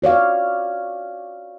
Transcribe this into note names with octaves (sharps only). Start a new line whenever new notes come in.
F#4 C#5 D5 F5